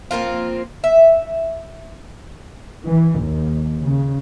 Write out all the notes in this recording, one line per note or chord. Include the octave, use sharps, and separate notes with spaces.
F3 A#3 C4 F4
E5
E3
D#2
C#3